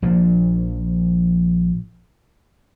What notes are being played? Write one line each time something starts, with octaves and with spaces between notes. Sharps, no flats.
A#1 A#2 F3